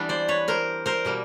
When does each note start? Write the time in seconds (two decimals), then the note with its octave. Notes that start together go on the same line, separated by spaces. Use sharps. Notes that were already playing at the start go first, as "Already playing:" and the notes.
Already playing: E3 G3 B3 D4
0.09 C5 D5
0.28 B4 C#5
0.48 A#4 C5
0.86 A#4 C5
1.05 B2 G3 A#3